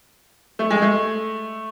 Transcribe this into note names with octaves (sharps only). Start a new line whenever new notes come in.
A3
G#3
A3